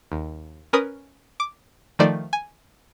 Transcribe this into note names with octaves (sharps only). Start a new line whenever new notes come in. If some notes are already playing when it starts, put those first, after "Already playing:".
D#2
C#4 A#4 B4 D#6
D6
D#3 F3 A3 D#4 C5 D5
G#5